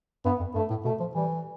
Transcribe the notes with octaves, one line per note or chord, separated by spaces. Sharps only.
G2 B3
F2
G2 A3
A2
B2 A3
F3
E3 G3